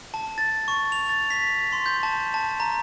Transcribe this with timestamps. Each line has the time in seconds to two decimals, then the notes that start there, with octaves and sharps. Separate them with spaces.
0.14 A5
0.38 A6
0.68 C#6
0.92 F7
1.09 A6
1.30 B6
1.73 C6
1.86 G6
2.03 A5
2.34 A5
2.60 A#5